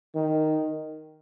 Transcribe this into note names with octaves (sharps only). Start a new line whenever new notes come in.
D#3